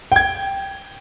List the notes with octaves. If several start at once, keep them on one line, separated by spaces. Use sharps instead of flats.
G5 G#6